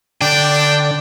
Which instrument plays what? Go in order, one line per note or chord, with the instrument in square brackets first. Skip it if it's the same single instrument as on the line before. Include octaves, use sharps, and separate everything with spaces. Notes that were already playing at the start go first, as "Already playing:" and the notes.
[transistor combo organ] D3 D5 [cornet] D4 [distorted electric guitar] G5